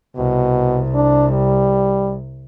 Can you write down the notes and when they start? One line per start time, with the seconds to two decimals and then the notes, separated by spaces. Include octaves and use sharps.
0.16 C2 B2
0.95 D4
1.31 G3